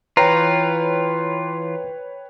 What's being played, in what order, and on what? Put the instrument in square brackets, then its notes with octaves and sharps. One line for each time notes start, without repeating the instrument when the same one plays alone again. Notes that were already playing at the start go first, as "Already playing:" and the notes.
[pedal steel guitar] E3 F4 [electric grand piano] B4 C#5 G5 [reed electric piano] A#5